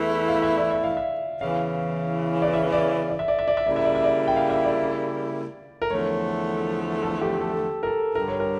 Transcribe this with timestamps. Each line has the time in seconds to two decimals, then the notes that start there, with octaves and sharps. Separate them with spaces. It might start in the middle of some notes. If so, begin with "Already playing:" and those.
Already playing: E2 E3 A3 E4
0.28 F5
0.43 E5
0.57 D5
0.71 E5
0.84 F5
0.97 E5
1.41 E2 C#3 E3 F5
2.42 D5
2.54 E5
2.72 D5
3.10 D5
3.19 E5
3.28 D5
3.39 E5
3.48 D5
3.57 E5
3.66 C#3 G3 A#3 E4 D5
3.76 E5
3.85 D5
3.95 E5
4.04 D5
4.28 G5
4.36 F5
4.50 E5
4.64 D5
5.82 A#4
5.90 E2 D3 F3 A3 C#5
7.03 A4
7.21 G4
7.41 A4
7.83 A#4
7.87 A4
8.15 G2 D3 G3 A#4
8.28 C#5
8.40 A#4